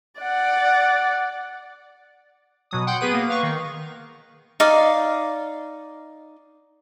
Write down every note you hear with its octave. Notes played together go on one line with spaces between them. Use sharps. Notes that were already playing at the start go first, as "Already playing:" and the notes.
D5 F#5
B2 F#3 D#6
F#5 G5 C6 G6
B3 G#4 B4 D#7
A#3
B4 F5 C#6
D#3
D#4 D5 F5